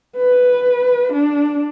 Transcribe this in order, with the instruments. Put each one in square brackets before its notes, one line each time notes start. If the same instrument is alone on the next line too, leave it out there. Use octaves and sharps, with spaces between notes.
[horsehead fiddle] B4
D4